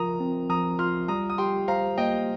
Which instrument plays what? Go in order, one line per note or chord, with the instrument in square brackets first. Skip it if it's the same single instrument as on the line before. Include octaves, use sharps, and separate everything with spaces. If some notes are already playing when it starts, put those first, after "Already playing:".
Already playing: [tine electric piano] F3 F4 A#4 [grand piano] A#5 D#6
[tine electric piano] C4
[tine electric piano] F3 [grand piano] A#5 D#6
[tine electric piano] F4 [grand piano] C6 F6
[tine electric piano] G3 [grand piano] A#5 D#6
[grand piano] D#6
[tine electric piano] G4 [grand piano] G5 C6
[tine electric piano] C5 [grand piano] F5 A#5
[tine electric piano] A#3 [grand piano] D#5 G5